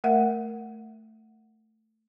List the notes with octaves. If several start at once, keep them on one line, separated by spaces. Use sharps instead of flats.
A3 A#4 E5 F#5